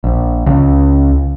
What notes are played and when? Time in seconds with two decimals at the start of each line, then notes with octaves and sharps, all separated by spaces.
0.04 A#1
0.46 C#2